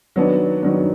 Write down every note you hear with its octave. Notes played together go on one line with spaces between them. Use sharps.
D#3 F#3 B3 D4
D#3 F#3 B3 D4